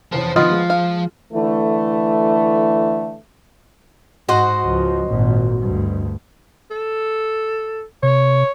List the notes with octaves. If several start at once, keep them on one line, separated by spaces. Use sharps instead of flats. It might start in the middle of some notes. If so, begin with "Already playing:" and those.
F1 E2 C#4 C5 A5
D3 D#3 F3 B3 F4 D#5
G#3
F5
D3 E3 A3
G#2 F#4 C5 D#5
C#2 F3
G#1 A#2
D2 G2
A4
C3 C#5